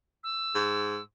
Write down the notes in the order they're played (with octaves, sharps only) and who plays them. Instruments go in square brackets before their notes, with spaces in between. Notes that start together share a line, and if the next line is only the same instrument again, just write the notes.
[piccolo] E6
[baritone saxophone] G#2